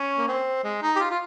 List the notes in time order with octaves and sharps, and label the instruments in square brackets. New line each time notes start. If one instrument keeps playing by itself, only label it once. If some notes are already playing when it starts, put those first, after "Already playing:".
Already playing: [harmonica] C#4
A#3
C4
G#3
D#4
G4
F4
F4